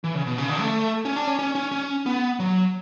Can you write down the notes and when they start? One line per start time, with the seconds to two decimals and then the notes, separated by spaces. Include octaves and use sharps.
0.04 E3
0.15 C#3
0.27 B2
0.38 C#3
0.49 D3
0.60 A3
1.05 C#4
1.16 D4
1.27 C#4
1.39 C#4
1.55 C#4
1.72 C#4
2.06 B3
2.39 F#3